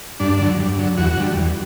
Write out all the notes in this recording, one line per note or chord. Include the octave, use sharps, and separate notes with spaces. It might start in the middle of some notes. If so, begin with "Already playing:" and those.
G2 D4
D3 F#3
G2
D3 F#3
E2 F#4
D3 G3
E2